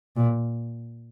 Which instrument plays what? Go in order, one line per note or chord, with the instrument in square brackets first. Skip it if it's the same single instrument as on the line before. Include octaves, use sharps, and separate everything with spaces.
[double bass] A#2